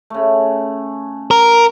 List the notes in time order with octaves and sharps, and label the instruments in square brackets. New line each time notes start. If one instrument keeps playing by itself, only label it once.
[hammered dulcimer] C#3 A3
[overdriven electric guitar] A#4